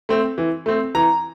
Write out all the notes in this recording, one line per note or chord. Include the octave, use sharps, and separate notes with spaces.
A3 C4
E3
A3 C4
E3 A#5